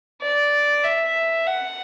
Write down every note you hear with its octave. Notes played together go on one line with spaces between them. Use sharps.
D5
E5
F#5